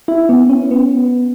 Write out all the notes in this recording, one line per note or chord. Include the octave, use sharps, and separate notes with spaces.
E4
B3
C#4
B3